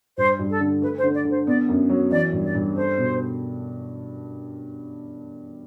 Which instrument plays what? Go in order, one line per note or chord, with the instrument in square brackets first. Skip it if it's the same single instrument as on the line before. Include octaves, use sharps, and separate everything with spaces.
[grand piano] G2 [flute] C5
[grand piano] G2
[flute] A4
[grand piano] D3
[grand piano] A3 [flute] B4
[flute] C5
[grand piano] D3
[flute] D5
[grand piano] D3
[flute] C5
[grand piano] B3 [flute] D5
[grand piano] F#2
F#3
[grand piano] E3 [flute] D5
[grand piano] G2
[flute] D5
[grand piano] G2
[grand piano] A4 [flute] C5
[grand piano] B2